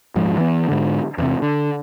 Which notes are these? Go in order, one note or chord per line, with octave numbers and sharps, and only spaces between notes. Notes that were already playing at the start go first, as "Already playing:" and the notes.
D#1 G#1 G#2 F3
E3 B3
G#2 D3
E2 C3
D3